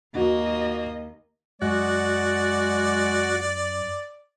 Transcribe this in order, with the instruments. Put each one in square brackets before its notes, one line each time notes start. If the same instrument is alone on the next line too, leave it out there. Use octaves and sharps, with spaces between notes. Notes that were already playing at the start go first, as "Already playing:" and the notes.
[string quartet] D#2 [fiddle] A#3 [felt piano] F#4 [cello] D#5
[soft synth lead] F#2 [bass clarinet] G#3 [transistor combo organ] F#4 [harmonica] D5